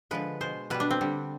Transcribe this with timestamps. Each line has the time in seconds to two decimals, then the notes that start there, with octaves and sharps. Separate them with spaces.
0.11 D3 F3 G#3 B4
0.41 B2 G#3 C5
0.70 B2 G3 B4
0.80 D4
0.91 C4
1.01 D3 G3